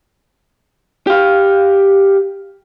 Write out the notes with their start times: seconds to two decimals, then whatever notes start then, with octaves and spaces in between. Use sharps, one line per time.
1.07 G4 F5